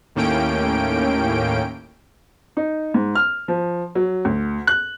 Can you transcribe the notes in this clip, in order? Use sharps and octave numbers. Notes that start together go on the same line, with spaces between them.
D#2 A2 A#3 C#4 G5 D7
D#4
G#2
F6
F3
F#3
D2
F#6